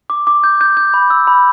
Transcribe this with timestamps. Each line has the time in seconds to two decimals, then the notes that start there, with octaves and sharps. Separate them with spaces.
0.10 D6
0.27 D6
0.44 G6
0.61 G6
0.77 G6
0.94 B5
1.10 E6
1.27 B5